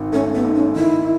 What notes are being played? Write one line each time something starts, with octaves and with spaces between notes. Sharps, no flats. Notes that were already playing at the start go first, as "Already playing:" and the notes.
Already playing: G#1 D#3
A3 C#4
B3
G#2
C#4
D#3 E4